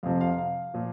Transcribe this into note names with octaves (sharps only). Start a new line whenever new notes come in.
F2 C3 F3 F5
F5
F5
A#2 F3